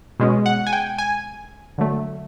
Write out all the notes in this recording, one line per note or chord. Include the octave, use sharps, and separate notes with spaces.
B2 G#3 C#4
F#5
G#5
G5
G#5
D3 F#3 A3